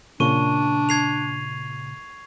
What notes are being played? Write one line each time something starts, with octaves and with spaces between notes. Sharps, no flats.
A#2 C#3 D4 C#6 D#7
G#6 C7 F7